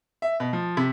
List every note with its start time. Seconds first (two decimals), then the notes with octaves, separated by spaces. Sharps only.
0.22 E5
0.40 B2
0.53 F3
0.77 C3